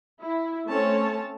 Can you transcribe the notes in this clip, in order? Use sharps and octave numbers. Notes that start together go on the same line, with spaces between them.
E4
A3 C4 C#4 C#5 A5